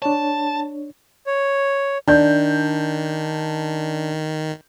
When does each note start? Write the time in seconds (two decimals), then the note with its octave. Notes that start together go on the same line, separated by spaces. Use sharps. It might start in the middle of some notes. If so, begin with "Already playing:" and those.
0.02 D4 C#5 A5
1.27 C#5
2.08 D#3 D4 G6